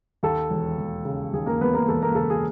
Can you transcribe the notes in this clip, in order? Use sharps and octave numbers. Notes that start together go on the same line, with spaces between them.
D#2 A4
E1
E1
C#3
D#2 G#4
A#3 A#4
E1 B3 B4
A#3 A#4
E1 A4
A#3 A#4
C#3 A4
G#4